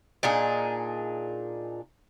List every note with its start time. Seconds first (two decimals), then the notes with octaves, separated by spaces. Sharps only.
0.23 A#2 D4 D#4 G#4